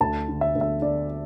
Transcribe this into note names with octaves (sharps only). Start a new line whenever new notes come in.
D2 A5
D3
E5
D2
E5
D3 D5